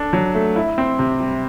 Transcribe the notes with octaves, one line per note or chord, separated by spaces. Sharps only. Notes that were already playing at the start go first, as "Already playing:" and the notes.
Already playing: D4 A4
F#3
A3
E4
C4
C3
G3